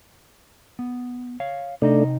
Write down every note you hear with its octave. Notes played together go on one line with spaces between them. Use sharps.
B3
C#5 F5
C3 A3 D4 D#4 D#5